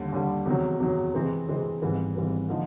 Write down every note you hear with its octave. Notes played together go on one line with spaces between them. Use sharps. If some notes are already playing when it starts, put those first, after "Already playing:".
Already playing: D#2 D3 G3
D#2 D3 G3
E2 C3 D#3 F#3
E2 C3 D#3 F#3
C3 E3 G#3 C4
C3 E3 G#3 C4
G#1 G#2 E3 G3 B3
G#1 G#2 E3 G3 B3
D3 F3 A#3 D#4